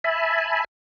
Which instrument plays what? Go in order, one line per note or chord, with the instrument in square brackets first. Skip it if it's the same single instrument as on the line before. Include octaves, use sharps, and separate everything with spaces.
[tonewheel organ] E5 G#5 A5 B5